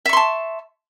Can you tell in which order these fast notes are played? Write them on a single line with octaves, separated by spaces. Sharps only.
E5 C#6 C6 A5